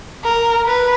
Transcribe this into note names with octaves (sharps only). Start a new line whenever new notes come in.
A#4
B4